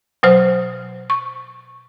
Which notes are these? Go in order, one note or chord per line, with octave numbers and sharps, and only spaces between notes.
B2 F#3 C5 F6
C#6